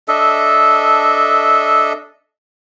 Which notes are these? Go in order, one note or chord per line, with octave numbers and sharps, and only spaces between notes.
D4 A4 D#5 E5